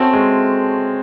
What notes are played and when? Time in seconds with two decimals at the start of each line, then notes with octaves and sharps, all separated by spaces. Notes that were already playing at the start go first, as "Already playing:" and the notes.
Already playing: A3 C4 C#4 F#4
0.13 G#3